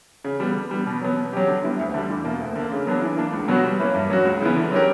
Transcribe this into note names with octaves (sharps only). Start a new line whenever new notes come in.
C#3
G3 B3
D3
G3 B3
B2
F#3 B3
B2
F#3 C#4 G4
D3
G3 B3 E4
D2
D3 G3
E2
B2 A#3
D2
D3 A#3
C#3
F#3 B3 D4
E3
A#3 D4
C#2
B2 F#3 B3 F#4
G3
A#3 C#4 E4 B4
G2
F#3 C#4 F#4
C#2
C#3 E3 B3
D3
F#3 C#4 G4 A#4